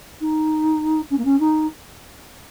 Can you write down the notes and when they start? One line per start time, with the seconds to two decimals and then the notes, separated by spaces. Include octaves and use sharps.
0.20 D#4
1.10 C#4
1.18 A#3
1.24 C#4
1.39 D#4